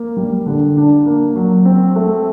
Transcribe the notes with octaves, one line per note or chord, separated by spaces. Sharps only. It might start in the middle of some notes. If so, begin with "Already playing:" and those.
Already playing: A#3
G3
D3
D4
A#3
F#3
C4
A3